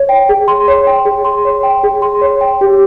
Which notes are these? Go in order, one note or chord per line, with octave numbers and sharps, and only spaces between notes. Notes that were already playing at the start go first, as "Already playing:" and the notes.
Already playing: C#5
G5
G#4
C6
C#5
G5
G#4
C6
C#5
G5
G#4
C6
C#5
G5
G4